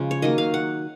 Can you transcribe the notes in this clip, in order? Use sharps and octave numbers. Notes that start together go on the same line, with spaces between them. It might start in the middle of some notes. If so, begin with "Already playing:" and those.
Already playing: C#3 F3 G#3
C#5
D#3 F#3 A#3 D#5
F5
F#5